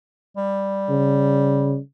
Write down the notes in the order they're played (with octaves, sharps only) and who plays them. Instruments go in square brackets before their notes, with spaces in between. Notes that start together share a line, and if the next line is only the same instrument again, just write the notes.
[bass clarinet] G3
[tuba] C#3